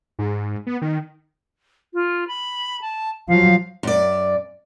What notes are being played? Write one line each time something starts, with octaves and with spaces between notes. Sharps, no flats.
G#2
B3
D#3
F4
B5
A5
F3 F#3 F5
F#2 D5